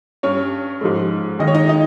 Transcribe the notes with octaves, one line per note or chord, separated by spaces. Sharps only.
G2 G3 C#4 C#5
G#2 F3 G#3
D#2 D#3 G#3 D#5
C#5
D#4 D#5
D#4 D#5